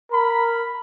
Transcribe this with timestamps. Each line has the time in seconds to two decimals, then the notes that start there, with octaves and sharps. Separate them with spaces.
0.12 A#4 B5